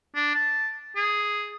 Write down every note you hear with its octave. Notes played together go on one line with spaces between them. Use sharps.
D4
A5
G#4